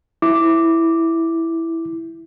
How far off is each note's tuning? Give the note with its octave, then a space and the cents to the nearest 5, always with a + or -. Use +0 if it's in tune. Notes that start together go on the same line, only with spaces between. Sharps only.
E4 +0 D6 +0